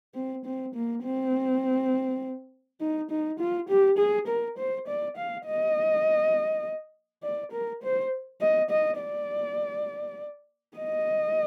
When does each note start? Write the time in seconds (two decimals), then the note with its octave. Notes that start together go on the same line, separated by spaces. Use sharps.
0.15 C4
0.45 C4
0.75 A#3
1.04 C4
2.80 D#4
3.11 D#4
3.39 F4
3.69 G4
3.98 G#4
4.27 A#4
4.58 C5
4.88 D5
5.17 F5
5.45 D#5
7.23 D5
7.52 A#4
7.82 C5
8.41 D#5
8.70 D#5
8.99 D5
10.77 D#5